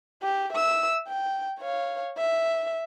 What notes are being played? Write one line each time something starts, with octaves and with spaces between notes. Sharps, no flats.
G4
E5 E6
G5
C#5 F5
E5